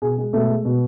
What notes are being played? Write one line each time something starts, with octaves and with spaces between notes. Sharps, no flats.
B2 G#4
G#3
B2 A3 A4
G#3
B2